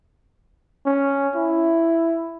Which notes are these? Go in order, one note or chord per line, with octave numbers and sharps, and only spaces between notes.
C#4
E4